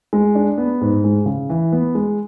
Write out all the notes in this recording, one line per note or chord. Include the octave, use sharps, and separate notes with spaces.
G#3
D4
B3
G#2
G#3
C#3
E3
B3
G#3